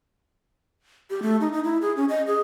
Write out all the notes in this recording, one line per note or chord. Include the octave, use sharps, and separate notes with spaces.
G4
A3
D#4
D#4
E4
G#4
C#4
D#5
G#4